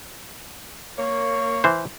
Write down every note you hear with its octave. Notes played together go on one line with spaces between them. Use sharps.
A#3 C#5
E3 C5